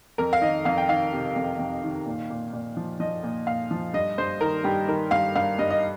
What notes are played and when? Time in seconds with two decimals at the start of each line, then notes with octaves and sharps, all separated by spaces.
0.18 F2 A#4
0.33 F5
0.41 D#3 D#5
0.65 F2 F5
0.78 G5
0.89 D#3 F5
1.13 C3
1.36 F2
1.59 F2
1.83 D#3
2.06 A#2
2.30 A#2
2.53 A#2
2.77 F3
3.00 F3 D#5
3.23 A#2
3.47 A#2 F5
3.71 F3
3.94 G2 D#5
4.18 G2 C5
4.41 D#3 A#4
4.64 G2 G4
4.88 D#3 A#4
5.11 G2 F5
5.35 G2 F5
5.59 G2 D#5
5.71 D#5